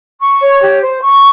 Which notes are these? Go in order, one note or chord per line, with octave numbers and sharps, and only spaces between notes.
C#6
C#5
G4
C5
C#6